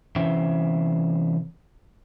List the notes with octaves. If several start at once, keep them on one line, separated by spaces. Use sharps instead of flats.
C3 E3 C#4 C5 E5